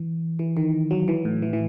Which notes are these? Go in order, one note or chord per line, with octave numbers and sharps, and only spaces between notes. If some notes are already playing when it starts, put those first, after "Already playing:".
Already playing: E3
E3
D#3
F#3
E3
A2
E3
E3